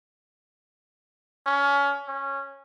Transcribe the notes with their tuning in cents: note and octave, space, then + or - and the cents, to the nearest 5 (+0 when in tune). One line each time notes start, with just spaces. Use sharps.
C#4 +25
C#4 -10